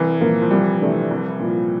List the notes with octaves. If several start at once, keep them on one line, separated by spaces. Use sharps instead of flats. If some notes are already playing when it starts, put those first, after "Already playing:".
Already playing: C2 E3
A#2 F3 A#3
F3
C2 G3
C3 E3 A3 D4
C2
A#2 F3